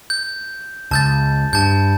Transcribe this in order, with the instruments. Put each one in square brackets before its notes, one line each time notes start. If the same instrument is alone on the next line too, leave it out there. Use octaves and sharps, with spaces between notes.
[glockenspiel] G6
[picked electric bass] C#2 [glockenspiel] A5 G6 A6
[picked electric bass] G2 [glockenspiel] A5 G6